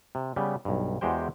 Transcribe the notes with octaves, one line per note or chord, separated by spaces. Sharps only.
C3
C#3 G3 B3
B1 G2
E2 G#3 F#4 G4 C5 G5